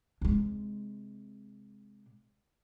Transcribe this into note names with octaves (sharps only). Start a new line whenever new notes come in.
C3 G#3